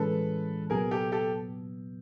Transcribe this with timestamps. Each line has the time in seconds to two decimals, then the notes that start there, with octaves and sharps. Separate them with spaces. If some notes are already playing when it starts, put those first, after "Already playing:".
Already playing: A2 E3 G#3 C#4 A4 B4
0.70 C2 A#2 F#3 B3 G#4 A#4
0.91 G4 A4
1.12 G4 A4